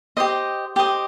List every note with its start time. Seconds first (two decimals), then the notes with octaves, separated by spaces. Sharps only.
0.17 G4 C5 D#5
0.76 G4 C5 D#5